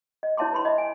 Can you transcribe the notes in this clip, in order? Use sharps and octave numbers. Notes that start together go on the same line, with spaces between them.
D#5
E4 C#5 E5 A5 C6 D6
B4 B5 C6
D#5 E5
G#5